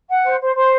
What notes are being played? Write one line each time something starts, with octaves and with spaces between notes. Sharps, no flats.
F#5
C5
C5
C5